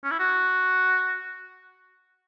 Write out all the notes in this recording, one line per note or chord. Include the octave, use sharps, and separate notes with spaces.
C#4
E4
F#4